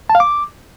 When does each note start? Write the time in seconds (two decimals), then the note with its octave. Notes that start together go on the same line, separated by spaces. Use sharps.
0.10 A5
0.15 F5
0.20 D6